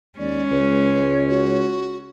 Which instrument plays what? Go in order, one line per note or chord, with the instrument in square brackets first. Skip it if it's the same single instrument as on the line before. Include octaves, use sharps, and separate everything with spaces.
[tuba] D#2 [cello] G#3 C#4 [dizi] D5
[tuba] C#2 [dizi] B4 [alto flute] C#5
[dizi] F#4